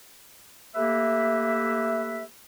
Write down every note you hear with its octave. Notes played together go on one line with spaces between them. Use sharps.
A3 A#3 G4 B4 E5